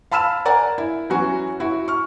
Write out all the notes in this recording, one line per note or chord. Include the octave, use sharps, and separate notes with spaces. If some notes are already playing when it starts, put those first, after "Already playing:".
F5 A5 B5 E6 F6 E7
A#4 D5 F#5 G#5 A#5
E4
E3 F#3 C#4 F#4
E4 F#4
C#6 F6